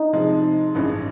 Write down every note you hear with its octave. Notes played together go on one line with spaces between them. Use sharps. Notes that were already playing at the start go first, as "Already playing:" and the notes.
Already playing: D#4
C3 F3 G#3
A1 G2 E3 G#3 C#4